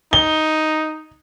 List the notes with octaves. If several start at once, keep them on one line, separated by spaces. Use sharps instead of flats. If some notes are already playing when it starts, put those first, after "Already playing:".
D#4 G7